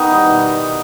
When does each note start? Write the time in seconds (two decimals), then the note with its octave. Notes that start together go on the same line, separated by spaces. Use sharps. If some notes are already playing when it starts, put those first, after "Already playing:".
Already playing: D#3 B3 D#4 G4
0.09 E3 G3
0.26 B2